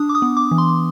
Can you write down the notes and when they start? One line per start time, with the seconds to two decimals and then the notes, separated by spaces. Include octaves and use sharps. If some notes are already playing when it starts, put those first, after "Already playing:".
Already playing: D4 D#6
0.09 D6
0.15 D#6
0.22 B3
0.37 D6
0.51 E3
0.58 C6